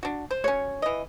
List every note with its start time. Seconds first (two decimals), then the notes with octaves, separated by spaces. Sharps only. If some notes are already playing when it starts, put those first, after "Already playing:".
0.03 D4 F#4
0.31 C5
0.44 F#3 C#4 C#5
0.82 E3 D#5